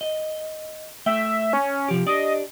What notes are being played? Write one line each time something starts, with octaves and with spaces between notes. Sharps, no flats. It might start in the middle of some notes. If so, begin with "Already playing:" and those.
D#5
A3 E5 G5
C#4
C3 F3 G4
D4 G4 D5 D#5